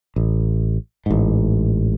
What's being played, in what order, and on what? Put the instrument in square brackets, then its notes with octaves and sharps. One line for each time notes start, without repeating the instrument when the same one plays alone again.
[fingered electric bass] A1
A1 G#2